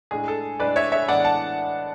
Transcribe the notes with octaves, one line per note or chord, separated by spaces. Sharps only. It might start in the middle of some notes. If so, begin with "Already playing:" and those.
A2 G#3 D4 G#4
A4
A2 G#3 D4 B4 D5
C#5 E5
C#5 E5
A2 E3 G#3 B3 D4 D5 F#5
F#5 A5